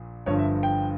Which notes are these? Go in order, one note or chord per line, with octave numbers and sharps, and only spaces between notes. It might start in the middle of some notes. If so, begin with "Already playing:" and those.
Already playing: A#1 A#2
G1 G2 F3 C#5
E5
G5